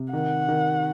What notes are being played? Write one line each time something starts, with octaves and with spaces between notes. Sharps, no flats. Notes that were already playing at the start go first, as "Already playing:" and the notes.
Already playing: C3
D#3 F#5
D#3